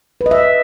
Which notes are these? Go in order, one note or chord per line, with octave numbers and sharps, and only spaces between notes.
B4
D#5
E5